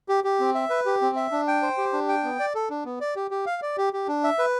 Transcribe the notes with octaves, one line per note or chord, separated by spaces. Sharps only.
G4
G4
C4
E5
B4
G4
C4
E5
D4
G5
C5
G4
D4
G5
B3
D5
A4
D4
B3
D5
G4
G4
F5
D5
G4
G4
D4
E5
B4